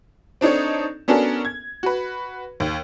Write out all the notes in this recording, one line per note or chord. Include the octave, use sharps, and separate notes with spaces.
C4 D4 D#4 A4 C#5
B3 C#4 D4 F#4 A4 A#4
G#6
F#4 B4
D#2